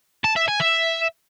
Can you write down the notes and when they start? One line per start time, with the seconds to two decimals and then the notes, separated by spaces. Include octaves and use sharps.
0.24 A5
0.36 E5
0.48 G#5
0.60 E5